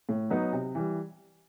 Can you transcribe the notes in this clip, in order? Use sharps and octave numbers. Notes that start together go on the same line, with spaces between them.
A2
F#3 B3 D#4
C3
E3 G3